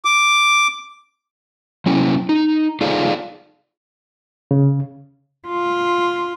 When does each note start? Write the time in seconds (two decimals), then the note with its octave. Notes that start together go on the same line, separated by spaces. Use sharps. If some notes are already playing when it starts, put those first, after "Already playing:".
0.05 D6
1.86 F#3 C#4 E4
2.29 D#4
2.81 D#4 F4 G#4 A4 D5 F5
4.51 C#3
5.48 F4